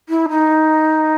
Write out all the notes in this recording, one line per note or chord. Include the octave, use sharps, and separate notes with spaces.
E4
D#4